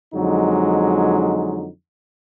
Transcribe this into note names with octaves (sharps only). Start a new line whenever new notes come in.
F2 D3 F#3 G#3 D#4